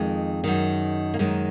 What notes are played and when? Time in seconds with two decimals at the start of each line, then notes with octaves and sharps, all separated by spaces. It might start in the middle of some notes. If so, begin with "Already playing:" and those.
Already playing: F2 D#3 G#3
0.44 F#2 D#3
1.14 A#3
1.19 F#2 D#3 G#3